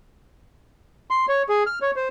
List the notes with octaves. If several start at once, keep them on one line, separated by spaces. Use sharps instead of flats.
C6
C#5
G#4
F6
C#5
C5